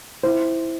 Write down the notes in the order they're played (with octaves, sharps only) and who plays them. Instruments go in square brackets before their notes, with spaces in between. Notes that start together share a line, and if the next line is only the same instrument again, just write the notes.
[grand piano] E4 [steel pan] C5